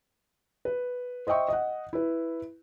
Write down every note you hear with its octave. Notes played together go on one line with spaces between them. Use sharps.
B4
C5 D#5 E5 G5 C#6
D#5 F#5
E4 B4